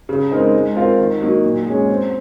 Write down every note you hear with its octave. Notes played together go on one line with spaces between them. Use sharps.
C#3
G#3 C4 D#4 A#4
G#3
C4 F4 A#4 F5
D#3
F#3 A#3 D#4 F#4
A#2
G#3 C#4 G#4 C#5
C4